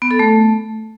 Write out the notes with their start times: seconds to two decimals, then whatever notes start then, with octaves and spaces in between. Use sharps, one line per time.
0.02 B3
0.11 A4
0.19 A3